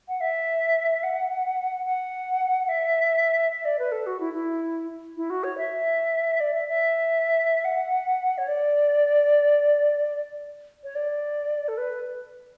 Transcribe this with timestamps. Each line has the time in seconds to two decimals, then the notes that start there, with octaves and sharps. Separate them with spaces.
0.08 F#5
0.21 E5
1.03 F#5
1.86 F#5
2.69 E5
3.52 E5
3.65 D5
3.79 B4
3.92 A4
4.06 F#4
4.20 E4
4.34 E4
5.17 E4
5.30 F#4
5.44 C#5
5.58 E5
6.40 D5
6.54 E5
6.68 E5
7.65 F#5
8.38 C#5
8.48 D5
10.84 C#5
10.95 D5
11.68 A4
11.77 B4